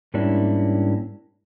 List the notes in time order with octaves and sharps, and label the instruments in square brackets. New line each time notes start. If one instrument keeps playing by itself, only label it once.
[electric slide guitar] G#2 G3 A#3 C#4 D4 E4